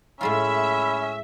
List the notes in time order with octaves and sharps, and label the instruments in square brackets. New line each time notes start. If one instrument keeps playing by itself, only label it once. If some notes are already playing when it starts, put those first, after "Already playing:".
[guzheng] A2 G#3 F4 [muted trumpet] C#4 [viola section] E5 [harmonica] B5